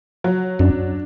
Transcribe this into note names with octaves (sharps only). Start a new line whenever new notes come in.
F#3
F#2 D4